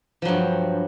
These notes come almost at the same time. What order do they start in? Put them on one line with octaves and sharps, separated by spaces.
F3 F#3 G2